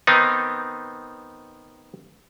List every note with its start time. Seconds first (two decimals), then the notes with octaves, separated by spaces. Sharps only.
0.07 D#3 B3 C4 D#4